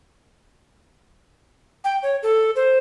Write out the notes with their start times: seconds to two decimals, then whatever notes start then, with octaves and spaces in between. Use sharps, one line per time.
1.84 G5
2.03 C#5
2.23 A4
2.56 C5